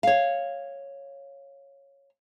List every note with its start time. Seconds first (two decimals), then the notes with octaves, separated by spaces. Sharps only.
0.03 C#5 F5